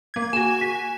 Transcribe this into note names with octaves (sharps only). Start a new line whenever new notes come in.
A#3 G#6
F#4 G#5 E7
B6